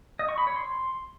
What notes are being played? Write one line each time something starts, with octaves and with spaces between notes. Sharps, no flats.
D#5
C#6
B5
C#5
C6